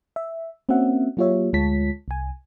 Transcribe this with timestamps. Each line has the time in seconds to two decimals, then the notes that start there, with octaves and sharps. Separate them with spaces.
0.16 E5
0.69 A#3 C4 C#4 F#4 E5 F#5
1.17 F#3 A#3 F4 G4 C#5 E5
1.53 D2 G#3 F4 C#5 A5 B6
2.08 C2 G#5